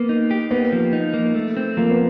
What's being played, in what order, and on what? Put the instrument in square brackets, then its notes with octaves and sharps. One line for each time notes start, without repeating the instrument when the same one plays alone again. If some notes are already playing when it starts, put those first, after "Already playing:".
Already playing: [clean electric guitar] A#3 [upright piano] B3
[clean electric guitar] D#4
G4
[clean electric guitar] A#3 [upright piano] B3
[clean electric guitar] F3
D#4
A#3
A3
C4
[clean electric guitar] F3 [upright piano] A#3
[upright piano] B3